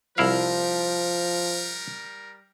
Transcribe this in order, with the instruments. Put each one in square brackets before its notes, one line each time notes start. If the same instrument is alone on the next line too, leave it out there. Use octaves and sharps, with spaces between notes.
[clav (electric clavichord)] C2 E4 F5 [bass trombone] F3 [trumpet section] G3 A#4